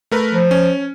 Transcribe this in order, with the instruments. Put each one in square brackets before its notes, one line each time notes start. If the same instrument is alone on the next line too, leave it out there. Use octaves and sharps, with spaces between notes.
[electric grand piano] A3 A#4 B4
[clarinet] F3
[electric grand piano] C#4